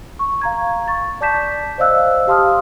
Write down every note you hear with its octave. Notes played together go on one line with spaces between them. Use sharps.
C#6
F5 A#5 G#6
C#6 A6
D5 A5 D6 G6 B6 E7
C5 D5 D#5 F5 E6 F#6
G4 F5 A5 C6 D#6 F6